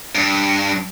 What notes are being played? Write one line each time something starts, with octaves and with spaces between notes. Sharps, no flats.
G2